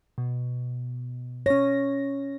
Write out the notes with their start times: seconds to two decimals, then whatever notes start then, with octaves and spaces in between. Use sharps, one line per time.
0.18 B2
1.46 C#4 C#5 A#6